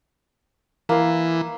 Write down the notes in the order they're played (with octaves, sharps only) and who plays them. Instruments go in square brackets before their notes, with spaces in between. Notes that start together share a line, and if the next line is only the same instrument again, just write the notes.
[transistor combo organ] E3 [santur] A#3 C6